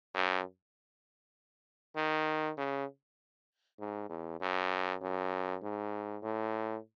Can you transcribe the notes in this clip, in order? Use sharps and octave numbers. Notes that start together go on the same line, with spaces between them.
F#2
D#3
C#3
G#2
E2
F#2
F#2
G#2
A2